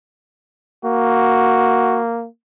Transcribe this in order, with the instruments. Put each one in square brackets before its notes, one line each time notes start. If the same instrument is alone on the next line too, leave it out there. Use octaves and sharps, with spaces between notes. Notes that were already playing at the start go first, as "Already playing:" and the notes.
[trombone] A#3 [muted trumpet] F#4